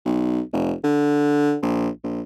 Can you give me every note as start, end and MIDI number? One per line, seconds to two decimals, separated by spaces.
0.06 0.41 35
0.53 0.74 29
0.84 1.57 50
1.62 1.89 34
2.03 2.21 34